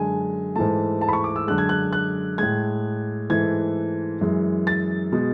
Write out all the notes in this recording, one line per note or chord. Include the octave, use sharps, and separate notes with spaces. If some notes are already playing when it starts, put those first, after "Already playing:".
Already playing: F#2 D3 G#3 G#5
G#2 E3 A3 A5
A5
B5
C#6
D6
E6
F#2 D3 G#3 F#6
G#6
F#6
F#6
A2 G#3 G#6
G#2 E3 A3 G#6
F#2 E3 G#3
A6
B2 G#3